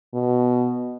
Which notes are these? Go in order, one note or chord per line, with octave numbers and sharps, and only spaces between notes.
B2